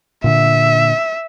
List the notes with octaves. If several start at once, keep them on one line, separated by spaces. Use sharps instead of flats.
A#2 D3 E5